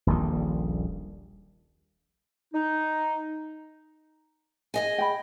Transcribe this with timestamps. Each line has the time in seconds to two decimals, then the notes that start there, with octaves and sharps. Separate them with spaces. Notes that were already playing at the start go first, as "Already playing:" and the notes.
0.07 D#1 A#1 D#3 G3
2.54 D#4
4.74 G#4 D#5 G#5
4.98 G5 B5